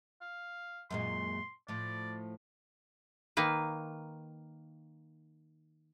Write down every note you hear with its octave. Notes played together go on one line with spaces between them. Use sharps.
F5
F#2 A#2 G#3 C6
A2 F3 D5
D#3 A#3 B4